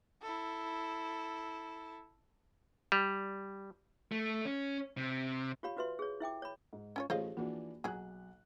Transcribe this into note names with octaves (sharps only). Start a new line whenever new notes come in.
E4 A4
G3
A3
C#4
C3
F4 G4 C#5 F5 B5
F4 F#4 B4 E5 C6
G#4 C#5
E4 E5 G5 D6
C#5 B5
G#2
C#4 F4 C#5
A1 A3 F4 G#4 C5 C#5 D#5 F5
E3 F3 A#3 D4 F#4
B1 F#3 G#4 F#5 F#6